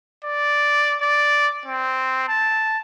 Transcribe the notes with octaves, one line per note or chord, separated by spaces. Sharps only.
D5
D5
C4
A5